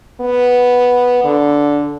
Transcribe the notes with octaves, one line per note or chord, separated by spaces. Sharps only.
B3
D3